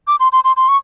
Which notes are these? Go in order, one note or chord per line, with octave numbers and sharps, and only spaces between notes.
D6
C6
C6
C6
C6
C#6